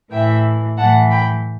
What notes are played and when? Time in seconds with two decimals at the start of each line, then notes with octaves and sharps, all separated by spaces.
0.11 A2 E3 E5 G5
0.77 A2 E3 F#5 A5
1.10 G5 B5